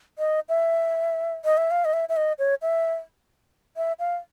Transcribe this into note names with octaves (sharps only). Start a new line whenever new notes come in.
D#5
E5
D#5
E5
F5
D#5
E5
E5
D#5
C#5
E5
E5
F5